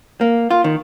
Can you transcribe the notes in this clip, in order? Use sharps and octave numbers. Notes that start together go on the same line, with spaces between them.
A#3
F4
D#3